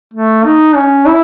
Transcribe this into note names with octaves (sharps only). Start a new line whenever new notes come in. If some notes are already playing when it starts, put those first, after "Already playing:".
A3
D#4
C#4
E4